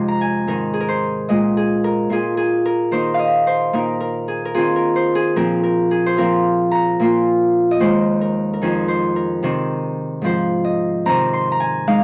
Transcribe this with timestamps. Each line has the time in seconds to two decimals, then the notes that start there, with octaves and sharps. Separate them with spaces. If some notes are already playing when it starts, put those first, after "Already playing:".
Already playing: F2 C3 G#3 C4 D#4
0.08 A#5
0.21 G#5
0.47 G#2 D#3 C4 A#4
0.74 G#4
0.80 A#4
0.89 C5
1.29 A#2 G#3 F4 D#5
1.57 G#4
1.84 A#4
2.10 A#2 A#3 F4 G#4
2.37 G#4
2.66 A#4
2.91 D#3 A#3 D#4 C5
3.14 D#5 F5
3.47 C5
3.73 A#2 A#3 D#4 A#4
4.00 A#4
4.28 G#4
4.45 A#4
4.55 D#3 C4 F4 G#4
4.76 A#4
4.96 C5
5.15 G#4
5.36 A#2 F3 C4 A#4
5.64 A#4
5.91 G#4
6.06 C5
6.17 A#2 F3 C4 F4 A#4
6.71 A#5
7.00 A#2 A#3 F4
7.71 D#5
7.80 D#2 D#3 G#3 C5
8.21 A#4
8.53 A#4
8.62 F2 D#3 C4 D#4 G#4
8.88 C5
9.16 A#4
9.43 C3 D#3 C4
10.22 G#2 F3 C4 C5
10.65 D#5
11.06 C3 D#3 C4 A#5
11.33 C6
11.52 A#5
11.60 G#5
11.87 G#3 D#4 F5